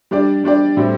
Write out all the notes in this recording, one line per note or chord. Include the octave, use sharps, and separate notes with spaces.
G3 D4 G4 D5
G3 D4 G4 D5
A2 G3 C4 G4 C5